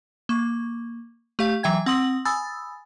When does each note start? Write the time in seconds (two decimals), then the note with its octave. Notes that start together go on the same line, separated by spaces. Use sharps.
0.29 A#3 C#6
1.39 A3 G4 F5
1.63 E3 F#3 E5 G5 G#6
1.86 C4 F#5 C6 D#6 F#7
2.25 G#5 B5 D#6 E6 A6